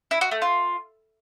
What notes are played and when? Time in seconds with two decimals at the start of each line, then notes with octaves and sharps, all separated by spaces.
0.11 E4
0.21 F#4
0.31 A3
0.42 F4